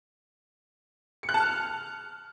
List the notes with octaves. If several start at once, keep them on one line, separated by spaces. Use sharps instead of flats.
C#7
F#6
A5
F6